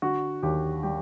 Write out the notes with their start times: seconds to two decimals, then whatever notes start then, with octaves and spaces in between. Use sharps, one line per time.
0.02 D3 F#4
0.43 D#2 G4
0.83 G3 G4